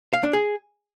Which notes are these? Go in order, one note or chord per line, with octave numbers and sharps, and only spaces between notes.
F5
D4
G#4